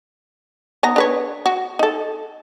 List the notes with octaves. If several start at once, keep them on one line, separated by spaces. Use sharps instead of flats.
B3 D#4 A#5
D4 B4 C#5
F#4
D#4 A4